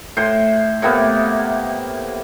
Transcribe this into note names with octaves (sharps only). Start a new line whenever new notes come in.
A2 C5 C6
A2 C3 A#3 B3